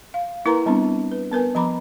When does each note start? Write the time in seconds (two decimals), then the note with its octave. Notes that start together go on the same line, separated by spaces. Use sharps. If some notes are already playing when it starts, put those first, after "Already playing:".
0.14 F5
0.45 A#3 E4 A#4 B4 A#5 C6
0.66 G3 B3 C4 D4
1.12 B4
1.32 B3 A#4 B4 G#5
1.55 F3 B3 A#5 B5 D6